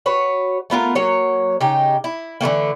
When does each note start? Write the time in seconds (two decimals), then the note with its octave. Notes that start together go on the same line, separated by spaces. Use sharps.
0.06 F#4 B4 C#5
0.70 A3 B3 F4 A#4
0.95 F#3 A#3 C#5
1.61 C#3 D#4 G4
2.04 E4
2.41 D3 E3 A3 A#3